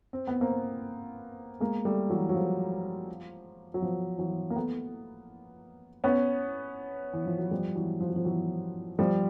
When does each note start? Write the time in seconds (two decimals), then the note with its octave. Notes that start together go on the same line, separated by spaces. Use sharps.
0.13 C4
0.27 B3
0.41 A#3 C4
1.60 G#3 A#3
1.85 G3 A3
2.10 E3 F#3
2.29 F#3
2.35 F3
3.74 F#3
3.82 F3
4.19 E3 F#3
4.50 A#3
4.56 A3 B3
6.04 B3 C#4
7.13 E3
7.26 F3
7.39 F#3
7.51 F3 G3
7.75 E3 F#3
8.00 F3
8.08 F#3
8.16 F3
8.25 E3 F#3
8.99 F3 G3